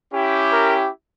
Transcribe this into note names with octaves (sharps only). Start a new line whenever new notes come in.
C#4 E4 G4
A#4